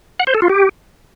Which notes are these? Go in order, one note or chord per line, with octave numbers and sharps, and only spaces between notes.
F#5
C5
A4
F4
G4